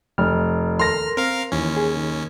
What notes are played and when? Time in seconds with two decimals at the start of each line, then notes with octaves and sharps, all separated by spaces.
0.18 F1 F6
0.79 D#2 A4 A#4 C6 F6 A#6
1.17 C4 A#4 F5
1.52 D#2 E3 C#4
1.77 G#4
1.97 D#3